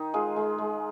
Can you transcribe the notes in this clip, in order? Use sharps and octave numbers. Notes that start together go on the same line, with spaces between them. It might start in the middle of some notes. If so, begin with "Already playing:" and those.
Already playing: D#3 D#4
G#3 F4 G#4
G#3
G#3